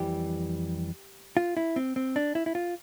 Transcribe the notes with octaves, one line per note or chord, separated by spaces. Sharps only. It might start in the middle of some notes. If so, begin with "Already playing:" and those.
Already playing: F2 E3 G3 G4
F4
E4
C4
C4
D4
E4
E4
F4